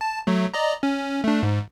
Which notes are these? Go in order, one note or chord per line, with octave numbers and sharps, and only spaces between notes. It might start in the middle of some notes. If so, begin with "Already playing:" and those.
A5
F#3 A3
D5 D#5 A#5
C#4
A3 D4
G#2